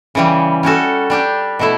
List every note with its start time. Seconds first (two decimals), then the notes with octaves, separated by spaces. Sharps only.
0.15 C#3 E3 G3
0.63 G3 C#4 F#4 A4
1.10 G3 D4 G4
1.59 B2 A3 E4